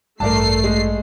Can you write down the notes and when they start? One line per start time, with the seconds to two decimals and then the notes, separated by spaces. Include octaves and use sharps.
0.20 A1 G2 A3 A#4 D5 A5 C7
0.64 G#3